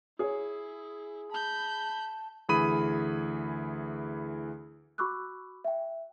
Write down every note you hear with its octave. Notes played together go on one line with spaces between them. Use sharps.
E4 G#4 C#5
A5 B5 G6
D2 E3 G#4 B5 D#6 D#7
F#4 B5 C#6 D6 E6 F#6
E5 G5